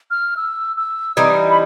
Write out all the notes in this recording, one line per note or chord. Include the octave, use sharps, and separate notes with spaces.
F6
E6
E6
E3 G3 C4 D#4 D#6
B5